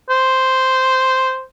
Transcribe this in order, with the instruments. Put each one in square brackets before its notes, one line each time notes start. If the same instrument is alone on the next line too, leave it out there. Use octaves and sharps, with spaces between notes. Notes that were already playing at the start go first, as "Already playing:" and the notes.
[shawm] C5